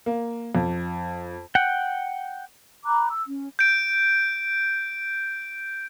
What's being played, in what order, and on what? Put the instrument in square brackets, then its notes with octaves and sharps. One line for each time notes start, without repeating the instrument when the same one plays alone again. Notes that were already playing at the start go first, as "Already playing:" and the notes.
[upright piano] A#3
F2
[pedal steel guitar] F#5 G5
[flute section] A#5 B5 D6 F#6
E6
C#4
[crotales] G6 D7